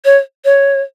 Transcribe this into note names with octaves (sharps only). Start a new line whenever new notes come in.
C#5
C#5